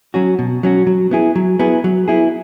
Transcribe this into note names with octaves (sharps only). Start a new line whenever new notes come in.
F#3 C#4 F#4
B2
F#3 C#4 F#4
F#3
B3 E4 G#4
F#3
B3 E4 G#4
F#3
B3 E4 G#4